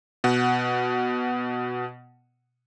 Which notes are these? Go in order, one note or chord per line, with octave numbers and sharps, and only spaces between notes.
B2 F#5